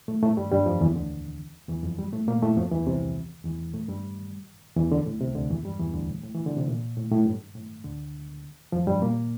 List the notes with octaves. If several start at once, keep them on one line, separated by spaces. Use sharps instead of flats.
A2 A3
A2 A3
G2 G3
G2 G3
F2 F3
E2 E3
D2 D3
E2 E3
F2 F3
G2 G3
A2 A3
A#2 A#3
A2 A3
F2 F3
E2 E3
C2 C3
E2 E3
A2 A3
G2 G3
E2 E3
D2 D3
A2
C2 C3
D2 D3
E2 E3
G2 G3
E2 E3
D2 D3
A2
A2
E3
D3
C3
A#2
A2
A2
G2
A2
D2 D3
F2 F3
G2 G3
A#2 A#3